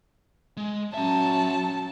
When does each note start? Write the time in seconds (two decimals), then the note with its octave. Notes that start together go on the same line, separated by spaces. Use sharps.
0.57 G#3
0.94 F#3 C#4 E5 A5 A#5